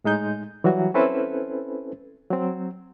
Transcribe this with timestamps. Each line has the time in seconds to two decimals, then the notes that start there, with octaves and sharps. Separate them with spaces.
0.04 A2 G#3 D#4 G6
0.64 E3 F#3 G3 F#4
0.94 C4 C#4 E4 A4 B4 C5
2.30 F#3 C4